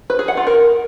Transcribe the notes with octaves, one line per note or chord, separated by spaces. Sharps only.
B4
G#4
F#5
F4
A#4